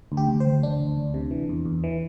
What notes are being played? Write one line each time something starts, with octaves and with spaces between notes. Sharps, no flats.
D2
G4
D2
C5
D2
D2 D4
D2
D2
C3
E3
E2
E2
E3